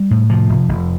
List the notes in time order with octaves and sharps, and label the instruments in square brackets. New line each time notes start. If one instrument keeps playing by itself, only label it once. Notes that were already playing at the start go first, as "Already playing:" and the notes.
Already playing: [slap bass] G3
A2
C3 F3
F1
F1